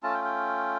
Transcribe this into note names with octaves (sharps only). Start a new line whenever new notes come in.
A3 C#4 F4 A5
G5
G5